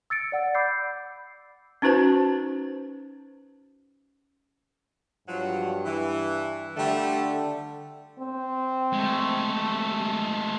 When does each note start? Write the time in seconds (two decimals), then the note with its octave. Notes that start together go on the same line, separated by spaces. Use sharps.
0.10 E6 A6 C#7 D7
0.32 D5 F#5
0.55 B5 D6 E6 G6 C7
1.82 C#4 D#4 F#4 B4 C5 A5
5.28 G2 F3 F#3
5.85 E3
6.76 D3 G3 A3
8.19 C4
8.93 G#3 A3